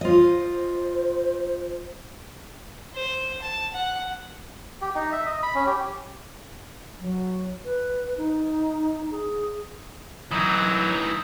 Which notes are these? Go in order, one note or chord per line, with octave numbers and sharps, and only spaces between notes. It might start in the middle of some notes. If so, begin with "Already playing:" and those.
F4 C5 D#5
C5
A5
F#5
G4
D#4
E5
D#5
B5
C#4
G4
F#3
B4
D#4
G#4
E3 F#3 D#4 D#6 G6